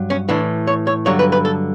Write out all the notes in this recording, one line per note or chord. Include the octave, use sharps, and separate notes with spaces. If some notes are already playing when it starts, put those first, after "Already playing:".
Already playing: G2 F#3
C#4
A2 E3 D4
C#5
C#5
G2 D3 F#3 C#5
B4
B4
A4